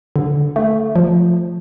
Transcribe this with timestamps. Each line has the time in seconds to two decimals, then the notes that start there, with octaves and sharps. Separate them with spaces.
0.16 D3
0.56 A3
0.96 F3